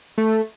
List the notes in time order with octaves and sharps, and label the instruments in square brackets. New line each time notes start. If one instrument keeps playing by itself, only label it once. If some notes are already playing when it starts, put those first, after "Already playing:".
[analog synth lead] A3